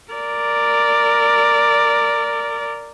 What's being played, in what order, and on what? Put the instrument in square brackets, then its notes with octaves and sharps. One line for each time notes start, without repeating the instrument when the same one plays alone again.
[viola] A#4 D5